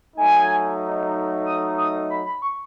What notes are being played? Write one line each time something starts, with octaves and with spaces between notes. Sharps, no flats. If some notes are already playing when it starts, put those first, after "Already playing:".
F#3 A3 D#4 G#5
D#6
D#6
B5
B5
C#6